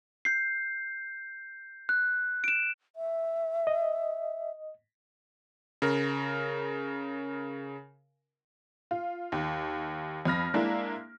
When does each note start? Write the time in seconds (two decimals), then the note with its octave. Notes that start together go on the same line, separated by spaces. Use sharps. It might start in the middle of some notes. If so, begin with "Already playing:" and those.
0.25 G6 C7
1.89 F#6
2.44 D7 E7
2.96 E5
3.67 D#5
5.82 C#3 A#4
8.91 F4
9.32 D#2
10.25 F2 B5 F6 A#6
10.54 G#3 A#3 D4 E4